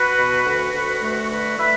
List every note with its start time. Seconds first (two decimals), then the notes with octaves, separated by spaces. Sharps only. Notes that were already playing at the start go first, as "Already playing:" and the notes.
Already playing: F#4 B4
0.18 B2
0.46 D2
0.74 D2
1.02 A3
1.29 D3 F#4 B4
1.58 A3 B4 E5